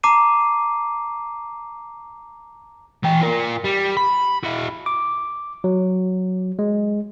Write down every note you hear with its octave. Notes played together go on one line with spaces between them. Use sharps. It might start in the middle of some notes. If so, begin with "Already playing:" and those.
A5 A#5 D6 C7 D#7
E3 G5
F4 A#4
G3
B5
E4 F#4
D6
F#3
G#3